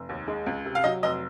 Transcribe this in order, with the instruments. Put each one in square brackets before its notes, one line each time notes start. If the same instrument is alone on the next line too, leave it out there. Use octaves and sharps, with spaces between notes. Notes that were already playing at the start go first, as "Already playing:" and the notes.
Already playing: [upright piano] F1
D#2
G#3
C#2
C3
F5
F#3 D#5
F1 D#5